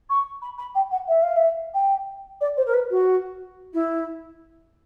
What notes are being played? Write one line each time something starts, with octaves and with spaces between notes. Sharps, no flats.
C#6
B5
B5
G5
F#5
E5
F5
E5
G5
D5
C5
A#4
B4
F#4
E4